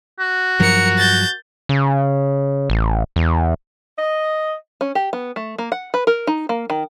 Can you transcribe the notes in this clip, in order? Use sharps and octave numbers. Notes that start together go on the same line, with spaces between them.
F#4
G2 F3 F#3 A#4 C#7
G6 A6
C#3
A1
E2
D#5
C#4
G4
B3
A3
A#3
F#5
B4
A#4
D#4
A#3
D#3